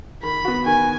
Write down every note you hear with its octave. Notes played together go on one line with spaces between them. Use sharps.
D#3 B5
B3 F#4
D#3 G#5